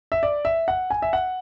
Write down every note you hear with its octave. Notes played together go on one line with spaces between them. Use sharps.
E5
D5
E5
F#5
G#5
E5
F#5